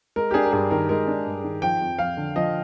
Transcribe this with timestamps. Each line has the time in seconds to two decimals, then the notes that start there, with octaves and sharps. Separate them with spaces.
0.16 G#3 A#4
0.31 G4
0.34 D4 G#4
0.45 A#4
0.52 G2 G#4
0.71 D#3 A#4
0.89 G#3 A#4
1.07 D4
1.26 G2
1.44 D#3
1.62 F3 G5
1.81 F2
1.99 F2 F5
2.17 D3
2.36 F3 D#5